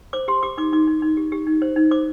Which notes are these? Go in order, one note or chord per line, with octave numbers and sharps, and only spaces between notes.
C5 D6
G4 C6
G4 D6
D#4 D6
D#4 D6
D#4
D#4
G4
G4
D#4
C5
D#4
C5 D6